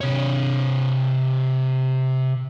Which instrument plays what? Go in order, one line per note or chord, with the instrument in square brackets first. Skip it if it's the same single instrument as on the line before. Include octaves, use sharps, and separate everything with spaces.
[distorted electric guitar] C3 C#5